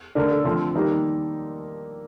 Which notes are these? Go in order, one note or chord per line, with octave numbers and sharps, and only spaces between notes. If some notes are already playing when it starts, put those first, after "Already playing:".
D3 A3 D4 A#4
A4
D3 F3 A3 C4
D#3 G3 A#3 D#4